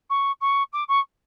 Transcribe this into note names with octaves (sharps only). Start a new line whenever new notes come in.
C#6
C#6
D6
C#6